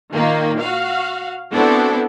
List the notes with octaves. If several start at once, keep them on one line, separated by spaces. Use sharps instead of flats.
A#2 D#3 A#3
F#4 F5
B3 C4 D4 E4 F#4 A4